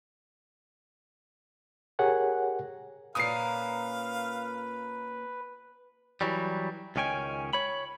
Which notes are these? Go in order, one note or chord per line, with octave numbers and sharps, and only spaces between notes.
G4 G#4 A#4 C#5 F#5 G#5
A#2 A#3 C#4 B4 F5 D#6 C7
E3 F#3 G3
C#2 D#3 C#4 G5 G#5
C#5 B5